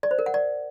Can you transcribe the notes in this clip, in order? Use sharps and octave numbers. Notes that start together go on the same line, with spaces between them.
D5
C5
A#4
F#5
D5